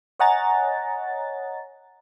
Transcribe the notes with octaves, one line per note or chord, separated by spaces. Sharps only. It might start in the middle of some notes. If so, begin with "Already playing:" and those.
C#5 D#5 F#5 G#5 A#5 A6